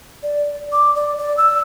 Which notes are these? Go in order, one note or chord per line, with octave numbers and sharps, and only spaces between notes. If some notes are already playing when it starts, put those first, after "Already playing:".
D5
D6
D5
D5
E6